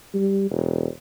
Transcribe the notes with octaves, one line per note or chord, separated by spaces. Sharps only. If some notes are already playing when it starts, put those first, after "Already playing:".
G3
E1